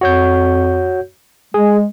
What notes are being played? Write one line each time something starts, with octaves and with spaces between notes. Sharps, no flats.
F2 F#4 C#5 G6
G#3 G#4